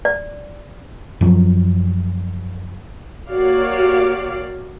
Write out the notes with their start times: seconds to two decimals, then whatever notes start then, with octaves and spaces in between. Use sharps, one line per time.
0.05 D5
1.21 F#2 F3 F#3
3.28 A#3 F#4 G4 C#5 D5 F5